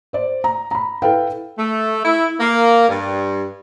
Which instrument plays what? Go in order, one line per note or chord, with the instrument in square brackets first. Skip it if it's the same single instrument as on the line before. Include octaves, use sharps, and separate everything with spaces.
[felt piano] C5 D5
A#5
A#5 B5
E4 A4 B4 F5 G5
[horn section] A3
E4
A#3
G2